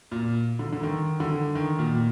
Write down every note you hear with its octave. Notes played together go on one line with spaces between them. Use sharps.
A#2
D3
D3
D#3
D3
D#3
A#2
A#2